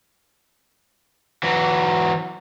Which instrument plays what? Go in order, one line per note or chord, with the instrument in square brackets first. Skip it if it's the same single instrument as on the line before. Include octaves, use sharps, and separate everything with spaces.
[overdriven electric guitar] E3 F#3